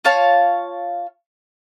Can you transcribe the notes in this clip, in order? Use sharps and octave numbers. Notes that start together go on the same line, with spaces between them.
F4 C#5 F5 A5